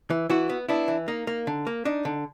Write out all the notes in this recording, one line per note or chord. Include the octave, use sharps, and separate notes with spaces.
E3
E3 E4 F#4
B3
B3 D4 E4
E3
A#3 D#4
A#3
D3
A#3
D4 D#4
D3